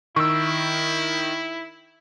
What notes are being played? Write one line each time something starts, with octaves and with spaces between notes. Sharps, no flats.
D#3 E4 C#6 E6